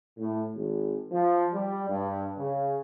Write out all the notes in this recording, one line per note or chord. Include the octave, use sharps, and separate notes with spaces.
A2
G#1
F3
G3
G2
C#3